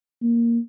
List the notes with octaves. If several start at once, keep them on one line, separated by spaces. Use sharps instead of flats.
A#3